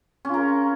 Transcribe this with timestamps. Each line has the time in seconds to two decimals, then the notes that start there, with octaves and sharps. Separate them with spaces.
0.25 C#4
0.29 F4
0.34 A#4